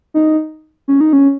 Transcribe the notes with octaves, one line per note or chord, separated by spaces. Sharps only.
D#4
C#4
D#4
C#4